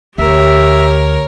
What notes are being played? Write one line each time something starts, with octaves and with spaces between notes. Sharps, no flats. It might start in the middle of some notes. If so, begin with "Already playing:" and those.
D2 G4 A#4 C#5 E5